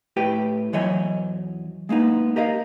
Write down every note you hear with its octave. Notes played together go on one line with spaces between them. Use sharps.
A2 G4 B4 G5
E2 E3 F#3 C#5 D#5 G#5
G#3 A#3 B3 D#4
G4 A#4 D#5 F5